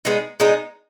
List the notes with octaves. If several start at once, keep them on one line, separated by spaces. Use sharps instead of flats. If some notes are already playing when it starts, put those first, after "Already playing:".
G#3 B3 D#4
G#3 B3 D#4